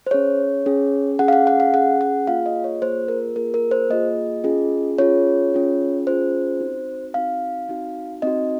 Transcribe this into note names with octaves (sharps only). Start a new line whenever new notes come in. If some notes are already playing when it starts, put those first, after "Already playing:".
C5
C#4 G#4 C#5
C#4 G#4
C#4 G#4 F#5
F5
F#5
F#5
F5
C#4 G#4 F#5
F#5
A#3 F4 G#4 F5
D#5
C#5
A#3 F4 G#4 C5
A#4
A#3 F4 G#4 A#4
A#4
C5
A#3 F4 G#4 D#5
C#4 F4 G#4
C#4 F4 G#4 C#5
C#4 F4 G#4
C#4 F4 G#4 C5
C4 D#4 F#4
C4 D#4 F#4 F5
C4 D#4 F#4
C4 D#4 F#4 D#5